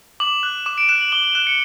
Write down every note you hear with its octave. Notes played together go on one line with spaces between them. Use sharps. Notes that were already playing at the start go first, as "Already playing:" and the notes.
D6 F#7
F#6
D6 E7
D7
F#6 E7
F#7
D6 G7
G7
F#6 E7
C#7